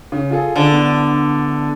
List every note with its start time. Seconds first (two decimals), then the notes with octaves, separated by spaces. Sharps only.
0.12 C#3
0.30 F4 G#4 A4
0.56 D3
0.72 B3 E4